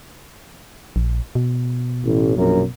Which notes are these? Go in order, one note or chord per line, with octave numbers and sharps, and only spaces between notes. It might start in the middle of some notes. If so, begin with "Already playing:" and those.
A#1
B2
A1
A#1 F#2 A#4